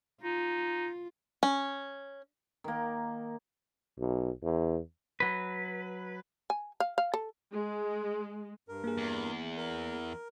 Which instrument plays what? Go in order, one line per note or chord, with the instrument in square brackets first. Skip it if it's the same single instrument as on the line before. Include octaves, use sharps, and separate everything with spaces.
[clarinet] D#4 [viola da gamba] F4
[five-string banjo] C#4
[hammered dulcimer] D#3 A#3
[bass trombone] B1
E2
[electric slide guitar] F#3 B4
[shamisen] G#5
F5
F5
A4
[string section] G#3
[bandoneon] G2 A#4
[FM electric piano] A#3 G#4
[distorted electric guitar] E2
[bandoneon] A#4